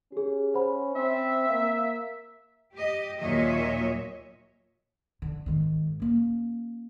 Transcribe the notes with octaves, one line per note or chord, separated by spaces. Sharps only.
C#4 G4 G#4
C5 F#5 B5
C4 E5
A#3 F5
G4 D#5
D#2 A#2 F#3 C#5 D#5 E5
D3
G#2 D#3
A#3 C#4